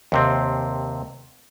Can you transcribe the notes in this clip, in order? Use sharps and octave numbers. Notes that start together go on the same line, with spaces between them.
D#2 C3 C4